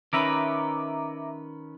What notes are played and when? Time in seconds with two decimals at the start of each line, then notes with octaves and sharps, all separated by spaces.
0.13 D#3 C#4 B4 E5 A#5 D6